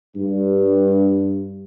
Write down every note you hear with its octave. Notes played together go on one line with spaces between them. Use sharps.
G2